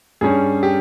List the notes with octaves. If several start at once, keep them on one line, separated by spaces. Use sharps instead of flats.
G2 G3 C#4 G#4
G4